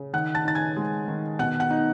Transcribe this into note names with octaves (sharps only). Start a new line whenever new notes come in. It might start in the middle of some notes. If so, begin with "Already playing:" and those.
Already playing: C#3
D#3 F#5 F#6
A5 A6
D#4 A6
G#5 G#6
G#3
D#3
B2 F#5 F#6
F#5 F#6
D#4